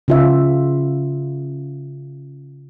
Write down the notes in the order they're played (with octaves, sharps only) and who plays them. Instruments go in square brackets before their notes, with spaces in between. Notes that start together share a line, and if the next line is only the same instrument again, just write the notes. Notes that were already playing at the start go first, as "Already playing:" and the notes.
[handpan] C#3 F4 E5